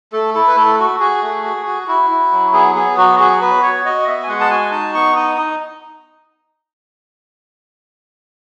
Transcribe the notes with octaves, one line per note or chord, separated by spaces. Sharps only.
A3 A4
E4 A4
B4
A3 A4
F#4
F#4 G#4
A3
F#4
F#4
E4 F#4
E4
F#3
B3 G#4
B3 G#4
F#3 F#4
F#4 G#4
B3 B4
F#4 C#5
F#4 D#5
B3 E5
G#5
G#3 F#5
A5
F#4 G#5
D#4 A5
B3 C#6
D#4 D#6
D#4